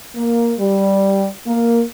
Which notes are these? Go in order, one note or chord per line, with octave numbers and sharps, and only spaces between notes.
A#3
G3
A#3